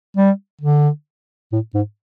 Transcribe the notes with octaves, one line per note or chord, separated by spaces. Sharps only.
G3
D3
A2
G#2